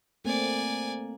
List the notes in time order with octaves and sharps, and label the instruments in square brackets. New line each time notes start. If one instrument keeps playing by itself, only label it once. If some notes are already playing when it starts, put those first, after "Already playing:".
[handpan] A3 A#3 C4 [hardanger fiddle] D5 G#5